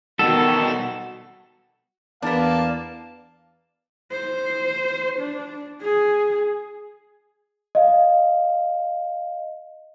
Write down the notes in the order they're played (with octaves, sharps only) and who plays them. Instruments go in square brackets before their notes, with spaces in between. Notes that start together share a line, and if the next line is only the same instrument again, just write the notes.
[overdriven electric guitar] B2 G3 [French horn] D#3 [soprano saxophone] F#4 [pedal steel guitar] A4
[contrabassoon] E2 [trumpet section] A#3 F5 A5 [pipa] B3 D4
[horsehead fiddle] C5
D4
G#4
[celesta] D#5 F5